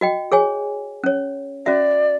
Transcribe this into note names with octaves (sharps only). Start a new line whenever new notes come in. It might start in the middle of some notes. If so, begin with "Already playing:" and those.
F#4 D#5 G5
G#4 C#5 G#5
C#4 C#5
C#4 F#4 D5 E5